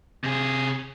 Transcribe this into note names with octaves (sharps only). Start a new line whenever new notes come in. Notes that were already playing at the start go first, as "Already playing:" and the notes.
C3 G#4